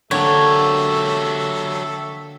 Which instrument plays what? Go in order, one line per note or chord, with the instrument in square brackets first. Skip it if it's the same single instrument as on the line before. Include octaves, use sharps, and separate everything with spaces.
[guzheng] D3 A#3 [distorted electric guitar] F#3 G4 [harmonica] A4 E5 [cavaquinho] C#5